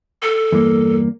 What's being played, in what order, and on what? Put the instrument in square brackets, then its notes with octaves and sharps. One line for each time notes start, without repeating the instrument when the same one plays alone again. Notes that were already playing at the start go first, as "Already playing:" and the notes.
[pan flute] A4
[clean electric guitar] E2 G2 A#3